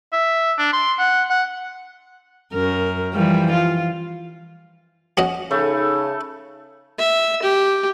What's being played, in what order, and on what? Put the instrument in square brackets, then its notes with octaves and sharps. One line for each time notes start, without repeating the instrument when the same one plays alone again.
[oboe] E5
D4
C6
F#5
F#5
[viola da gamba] F#2 A#4
E3 F3 G3
F4
[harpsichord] C#4 F#4 D#5
[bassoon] C#3 [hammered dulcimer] A3 [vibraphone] D#4 B5
[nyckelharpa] E5
G4